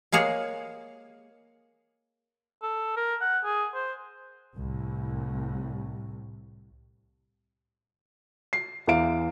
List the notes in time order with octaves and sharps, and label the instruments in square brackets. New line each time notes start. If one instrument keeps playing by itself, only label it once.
[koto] G#3 A#3 G#4 C#5
[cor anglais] A4
A#4
F#5
G#4
C5
[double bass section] C2 A2
[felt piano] C7
E2 E3 F5 D7